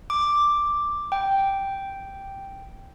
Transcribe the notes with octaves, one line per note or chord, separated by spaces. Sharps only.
D6
G5